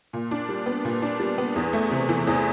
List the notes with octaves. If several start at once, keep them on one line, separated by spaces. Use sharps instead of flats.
A#2
D4
G3
B3
A#2
D4
G3
B3
E2
A3
C3
E3
E2